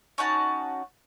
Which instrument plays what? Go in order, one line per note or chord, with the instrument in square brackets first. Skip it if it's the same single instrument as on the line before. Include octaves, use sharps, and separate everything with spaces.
[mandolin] C#4 D#4 F#4 A5